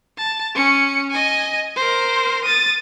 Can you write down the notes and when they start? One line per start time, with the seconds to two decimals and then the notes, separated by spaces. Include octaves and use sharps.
0.18 A5
0.55 C#4 C#7
1.11 D#5 G#5
1.76 A#4 C5
2.45 D#6 A6